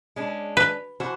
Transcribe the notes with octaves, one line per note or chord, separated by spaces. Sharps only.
G#3 C#4 D4
B4
E3 F#4 C5